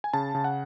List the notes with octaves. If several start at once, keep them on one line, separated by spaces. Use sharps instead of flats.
G#5
C#3 A5
C#3
F#5